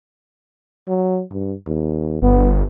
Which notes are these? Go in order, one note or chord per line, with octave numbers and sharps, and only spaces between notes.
F#3
G2
D#2
G1 B3